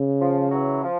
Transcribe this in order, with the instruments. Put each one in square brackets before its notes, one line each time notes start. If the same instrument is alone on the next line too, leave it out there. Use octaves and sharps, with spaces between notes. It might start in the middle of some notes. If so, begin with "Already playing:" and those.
Already playing: [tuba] C#3
[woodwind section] F3
E3 F#3
F3